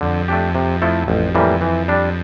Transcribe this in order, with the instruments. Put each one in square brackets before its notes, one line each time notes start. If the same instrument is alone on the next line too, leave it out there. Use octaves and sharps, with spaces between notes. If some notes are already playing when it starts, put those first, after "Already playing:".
[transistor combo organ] F2 [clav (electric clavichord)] D3
[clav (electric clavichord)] A3 D4 G4
C3
F3 A3 E4 A4
[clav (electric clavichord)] A1 [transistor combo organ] F2
[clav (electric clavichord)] A2 E3 G3 A#3
E3
G3 D4